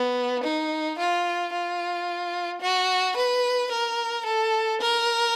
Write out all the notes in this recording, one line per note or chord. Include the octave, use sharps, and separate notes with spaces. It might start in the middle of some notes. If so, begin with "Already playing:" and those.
Already playing: B3
D#4
F4
F4
F#4
B4
A#4
A4
A#4